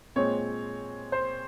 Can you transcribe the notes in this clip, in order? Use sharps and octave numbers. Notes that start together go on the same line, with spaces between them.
A#2 G#3 C4 C#5
C5